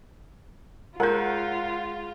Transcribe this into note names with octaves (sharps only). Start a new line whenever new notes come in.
G#3 F4 G#4 A#4 F#5 F#6 G6